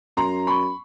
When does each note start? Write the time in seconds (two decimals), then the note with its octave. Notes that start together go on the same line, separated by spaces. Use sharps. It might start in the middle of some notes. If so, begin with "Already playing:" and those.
0.17 F#2 A#5 C6
0.47 B5 C#6